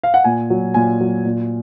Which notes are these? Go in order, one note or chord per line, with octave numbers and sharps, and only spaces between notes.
F5
F#5
A#2 G#5
F#3
A#2 G#5
F#3
A#2